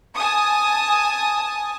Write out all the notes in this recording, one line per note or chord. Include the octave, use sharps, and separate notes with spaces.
G#5 A5 D#6